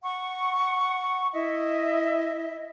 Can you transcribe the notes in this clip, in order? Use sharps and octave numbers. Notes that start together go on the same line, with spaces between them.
F#5 C#6
E4 D#5 E5